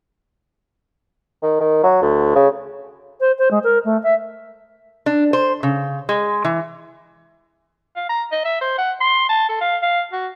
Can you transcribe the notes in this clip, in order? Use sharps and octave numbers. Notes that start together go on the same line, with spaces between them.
D#3
D#3
F#3
D2
C#3
C5
C5
G#3
A#4
A3
E5
D4
C5
C#3
G#3
E3
F5
A#5
D#5
E5
C5
F#5
C6
A5
A4
F5
F5
F#4